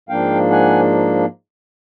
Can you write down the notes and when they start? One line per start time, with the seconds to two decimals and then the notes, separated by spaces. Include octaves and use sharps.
0.09 G#2 F3 A#3 D4 F5 G5
0.50 F#5 G#5